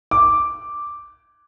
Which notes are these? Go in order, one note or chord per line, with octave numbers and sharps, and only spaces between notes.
D6